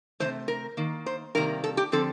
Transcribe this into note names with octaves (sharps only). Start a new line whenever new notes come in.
C3 D#3 A3 C5
A#4
D#3 A#3
C5
C3 D#3 G3 A#3 A#4
A4
G4
D3 F3 C4 A4